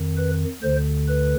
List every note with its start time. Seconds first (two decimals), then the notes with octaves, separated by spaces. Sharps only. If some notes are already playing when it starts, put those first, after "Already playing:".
Already playing: F2 D#3
0.17 B4
0.62 D2 D3 C5
1.08 B4